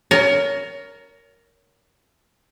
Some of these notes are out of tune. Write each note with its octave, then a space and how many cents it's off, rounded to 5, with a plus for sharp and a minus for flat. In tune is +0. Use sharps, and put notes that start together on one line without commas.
A#4 +0 C#5 +20 A5 -40